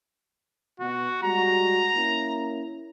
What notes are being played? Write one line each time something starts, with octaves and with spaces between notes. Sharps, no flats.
B2 F#4
G3 G#3 F#4 A#5
A#3 C#4 E4